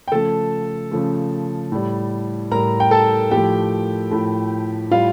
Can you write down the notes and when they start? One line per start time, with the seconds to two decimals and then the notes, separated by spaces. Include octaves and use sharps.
0.08 G5
0.12 C#3 F3 A3 A4 A5
0.91 C#3 F3 A3
1.72 A2 G3
2.51 A2 G3 A#4 A#5
2.80 G5
2.91 A4 A5
3.31 A2 F3 A3 G4 G5
4.11 A2 F3 A3
4.91 A2 G3 F4 F5